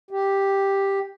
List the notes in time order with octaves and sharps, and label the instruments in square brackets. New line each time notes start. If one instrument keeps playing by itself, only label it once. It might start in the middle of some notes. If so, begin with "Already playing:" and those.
[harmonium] G4